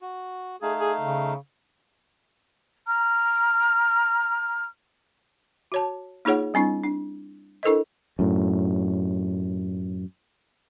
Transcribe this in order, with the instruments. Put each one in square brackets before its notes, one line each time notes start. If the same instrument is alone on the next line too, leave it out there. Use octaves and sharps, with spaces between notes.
[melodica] F#4
[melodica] A3 D#4 F5 [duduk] G#4
[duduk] G#4
C#3
[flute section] A#5 F6
[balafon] F#4 C#5 A5
A#3 D#4 F4 G#4 C#5 F#5
G3 C4 D4 E4
D4
D4 E4 A4 A#4 C5 D#5
[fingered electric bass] F#2 A2